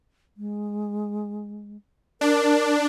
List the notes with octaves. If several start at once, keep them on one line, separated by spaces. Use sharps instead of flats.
G#3
D4 A#4